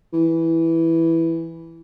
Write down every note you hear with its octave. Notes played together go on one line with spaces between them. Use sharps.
E3